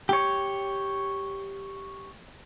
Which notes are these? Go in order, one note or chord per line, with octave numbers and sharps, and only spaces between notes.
G4 C#5